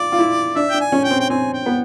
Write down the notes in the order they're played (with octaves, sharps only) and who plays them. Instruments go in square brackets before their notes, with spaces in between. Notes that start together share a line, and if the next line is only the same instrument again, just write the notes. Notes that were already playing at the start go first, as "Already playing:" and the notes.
Already playing: [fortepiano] F4 [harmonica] D5
[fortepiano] F4
E4
[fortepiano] D4 [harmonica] E5
[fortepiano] D4 [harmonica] G5
[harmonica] G#5
[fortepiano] C#4
[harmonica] G5
[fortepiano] C4
[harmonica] G5
[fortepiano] C4 [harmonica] G#5
[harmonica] G5
[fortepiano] B3